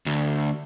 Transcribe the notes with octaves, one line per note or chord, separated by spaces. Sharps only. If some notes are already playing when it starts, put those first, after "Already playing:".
D2